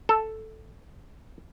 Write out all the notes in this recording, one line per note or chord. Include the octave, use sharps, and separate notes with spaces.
A4